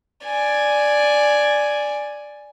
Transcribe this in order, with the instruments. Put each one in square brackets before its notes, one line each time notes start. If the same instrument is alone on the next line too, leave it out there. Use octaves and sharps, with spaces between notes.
[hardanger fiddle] D5 G#5